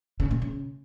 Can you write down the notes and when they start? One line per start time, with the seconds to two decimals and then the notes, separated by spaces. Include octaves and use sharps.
0.20 C#3
0.31 A#2
0.42 C#3